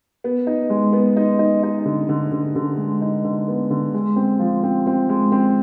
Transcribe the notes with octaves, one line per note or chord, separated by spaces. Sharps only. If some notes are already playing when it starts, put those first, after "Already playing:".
B3
D#4
G#3
B3
D#4
D#4
D#4
D3
D3
D3
D3
G#3
D#4
D3
B3
D3
G#3
C4
F3
C4
C4
G#3
C4